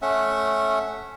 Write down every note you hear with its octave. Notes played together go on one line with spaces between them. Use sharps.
A3 C#4 E5 F#5